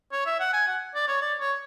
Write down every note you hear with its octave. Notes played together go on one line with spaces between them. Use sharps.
C#5
E5
F#5
G#5
F#5
D5
C#5
D5
C#5